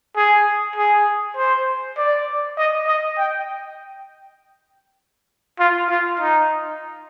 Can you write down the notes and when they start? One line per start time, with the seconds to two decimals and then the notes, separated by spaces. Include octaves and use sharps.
0.16 G#4
0.76 G#4
1.37 C5
1.98 D5
2.58 D#5
2.87 D#5
3.18 G5
5.59 F4
5.89 F4
6.20 D#4